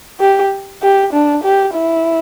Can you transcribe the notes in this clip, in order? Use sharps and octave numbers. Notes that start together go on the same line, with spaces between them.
G4
G4
D4
G4
E4